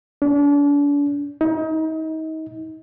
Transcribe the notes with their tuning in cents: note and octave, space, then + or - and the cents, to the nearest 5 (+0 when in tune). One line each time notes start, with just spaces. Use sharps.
D4 -40
D#4 +35